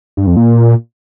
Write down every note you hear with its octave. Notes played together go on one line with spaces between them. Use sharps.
G2
F2
A#2